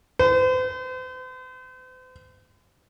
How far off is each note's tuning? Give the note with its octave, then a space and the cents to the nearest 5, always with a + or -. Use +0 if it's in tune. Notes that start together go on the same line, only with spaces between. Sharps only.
C5 -45